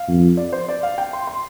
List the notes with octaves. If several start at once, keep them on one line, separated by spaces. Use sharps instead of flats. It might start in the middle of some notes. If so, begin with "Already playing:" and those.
Already playing: F5
F2
D5
C5
D5
F5
G5
C6
C6